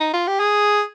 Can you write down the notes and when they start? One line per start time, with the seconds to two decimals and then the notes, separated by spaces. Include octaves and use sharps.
0.01 D#4
0.14 F4
0.28 G4
0.40 G#4